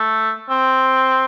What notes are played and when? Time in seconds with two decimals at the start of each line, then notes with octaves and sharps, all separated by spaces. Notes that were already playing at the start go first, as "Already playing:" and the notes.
Already playing: A3
0.50 C4